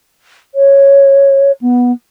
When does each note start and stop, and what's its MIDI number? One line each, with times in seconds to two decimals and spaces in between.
0.54 1.51 73
1.61 1.92 59